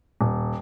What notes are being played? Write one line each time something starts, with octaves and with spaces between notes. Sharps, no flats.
D#1